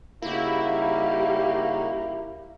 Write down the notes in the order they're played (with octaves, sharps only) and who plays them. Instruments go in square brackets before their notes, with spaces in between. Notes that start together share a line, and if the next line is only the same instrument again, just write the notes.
[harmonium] C#3 D#4 F#4 [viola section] G3 G4 [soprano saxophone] A#3 [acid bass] E4